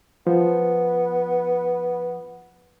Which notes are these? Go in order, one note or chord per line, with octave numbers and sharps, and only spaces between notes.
F3 B3